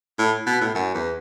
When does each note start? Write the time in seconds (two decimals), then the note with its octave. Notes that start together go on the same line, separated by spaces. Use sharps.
0.19 A2
0.46 B2
0.61 A2
0.75 F#2
0.94 E2